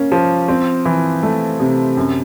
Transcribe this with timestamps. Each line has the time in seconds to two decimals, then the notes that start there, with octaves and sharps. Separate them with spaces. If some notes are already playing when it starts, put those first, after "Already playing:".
Already playing: A#3 C#4
0.12 F3
0.48 C4
0.86 E3
1.23 A3
1.60 C3
1.97 F#2